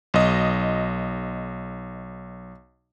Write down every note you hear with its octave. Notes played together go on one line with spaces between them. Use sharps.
B1 D#5